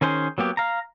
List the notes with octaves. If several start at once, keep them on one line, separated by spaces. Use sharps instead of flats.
D#3 C#4 G#4 C5
F#3 A#3 B3 G4
F5 A#5